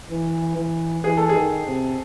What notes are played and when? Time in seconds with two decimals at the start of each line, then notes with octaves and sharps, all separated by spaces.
0.11 E3
0.57 E3
1.04 E3 G#4
1.17 A4
1.29 G#4
1.36 D#3
1.67 C3